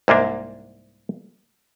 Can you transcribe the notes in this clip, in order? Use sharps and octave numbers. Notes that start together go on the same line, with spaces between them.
C2 G#2 A#3 D4